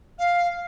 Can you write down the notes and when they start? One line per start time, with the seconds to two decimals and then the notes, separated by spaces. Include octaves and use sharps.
0.18 F5